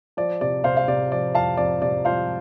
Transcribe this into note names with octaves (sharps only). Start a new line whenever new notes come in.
F3 D5
C3 D5
C3 C5 F5
F5
C3 D5
F3 D5
F2 F5 A5
F2 D5
C3 D5
F3 C5 F5